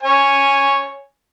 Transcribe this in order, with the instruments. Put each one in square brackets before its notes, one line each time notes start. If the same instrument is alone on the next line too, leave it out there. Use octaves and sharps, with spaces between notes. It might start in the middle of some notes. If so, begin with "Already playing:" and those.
[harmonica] C#5 G#5